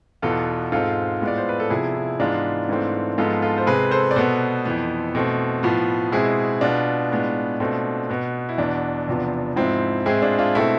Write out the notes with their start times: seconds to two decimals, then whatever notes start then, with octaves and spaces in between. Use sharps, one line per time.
0.22 E2 B2 B3 F4 A4
0.72 G#2 G#3 C4 F4 A4
1.21 A2 G#3 B3
1.27 D5
1.38 C5
1.49 B4
1.60 A4
1.70 C3 F3 B3 E4 G#4
1.95 E4
2.19 G#2 E3 G#3 B3 D4 F4
2.69 G#2 E3 A3 C4
3.18 G#2 F3 G#3 B3 F4 A4
3.42 F4 A4
3.58 C5
3.66 C3 G#3 C4 G#4 B4
3.91 A4 C5
4.11 D5
4.16 B2 B3 A4 C5
4.65 F2 E3 B3
5.15 B2 A3 C4
5.63 A2 F3 B3
6.12 B2 G#3 C4 E4 G#4
6.61 B2 B3 D4 F4
7.11 A2 G#3 B3
7.60 B2 A3 C4
8.09 B2 B3
8.49 E4
8.58 E2 B2 B3 D4
9.08 E2 C3 F3 B3
9.56 G#2 F3 G#3 C4 E4
10.06 A2 G#3 C4 E4 G#4
10.22 D4 F4
10.39 D4 F4
10.55 B2 A3 C4 E4